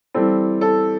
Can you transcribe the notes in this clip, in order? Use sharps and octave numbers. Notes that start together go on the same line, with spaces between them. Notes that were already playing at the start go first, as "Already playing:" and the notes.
E3 G3 C4 A4
A4